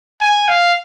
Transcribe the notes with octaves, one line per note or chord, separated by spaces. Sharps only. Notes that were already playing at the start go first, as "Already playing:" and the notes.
G#5
F5